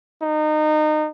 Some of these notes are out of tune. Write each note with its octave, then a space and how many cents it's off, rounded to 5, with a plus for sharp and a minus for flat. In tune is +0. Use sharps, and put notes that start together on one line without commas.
D#4 -25